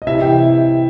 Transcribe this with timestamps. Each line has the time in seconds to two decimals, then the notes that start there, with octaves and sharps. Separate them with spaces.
0.02 D#5
0.07 C3 E4 E5
0.21 E3 G4 G5